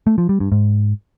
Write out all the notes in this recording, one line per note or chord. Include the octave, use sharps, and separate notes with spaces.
A3
F3
G3
G2
G#2